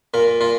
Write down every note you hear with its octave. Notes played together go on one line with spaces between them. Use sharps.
A#2 A#4
A#2 F4